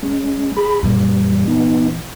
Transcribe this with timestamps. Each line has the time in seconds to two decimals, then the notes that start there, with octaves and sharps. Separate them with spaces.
0.02 G#3 C#4
0.57 G#4 B5
0.83 F#2 A#2 E3 G3
1.48 B3 D#4